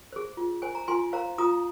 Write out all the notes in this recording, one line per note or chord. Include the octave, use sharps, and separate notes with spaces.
G#4 C5
F4
C5 G#5
A#5
F4 G#5 C6
C5 F5 A#5
F4 A#5 D#6